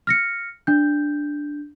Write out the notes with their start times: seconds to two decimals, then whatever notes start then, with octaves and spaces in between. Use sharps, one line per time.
0.07 F6 A#6 C#7
0.67 D4 G6